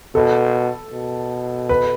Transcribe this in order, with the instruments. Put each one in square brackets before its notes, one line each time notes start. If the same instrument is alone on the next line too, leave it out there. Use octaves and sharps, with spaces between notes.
[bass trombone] B2 [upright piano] A4
[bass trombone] B2
[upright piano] B4